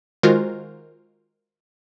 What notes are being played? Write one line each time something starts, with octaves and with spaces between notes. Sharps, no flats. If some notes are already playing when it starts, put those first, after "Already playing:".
D#3 G#3 F4 F#4 A#4 C5